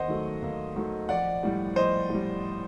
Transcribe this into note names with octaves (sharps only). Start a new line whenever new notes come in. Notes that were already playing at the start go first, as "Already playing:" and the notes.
Already playing: D#2 C5 D#5 F#5
D#3 F#3 A3
D#2
D#3 F#3 A3
A#1 D5 F#5
A2 G3
A#1 C5 D#5
A2 G3